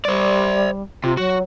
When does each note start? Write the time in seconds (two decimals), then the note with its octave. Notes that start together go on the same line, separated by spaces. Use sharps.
0.05 G3 C5 D5
1.04 C3 F4
1.17 F#3 F#4